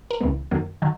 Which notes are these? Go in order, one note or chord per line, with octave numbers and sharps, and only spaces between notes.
A#4
C#2 C#3 E3 G#3 B3
F#2 D#3 F#3 A#3
D#3 F#3